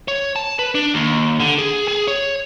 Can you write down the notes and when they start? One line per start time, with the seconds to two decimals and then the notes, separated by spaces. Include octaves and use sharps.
0.08 C#5
0.36 A5
0.59 B4
0.75 D4
0.94 D#2
1.40 D3
1.58 G#4
1.88 G#4
2.08 C#5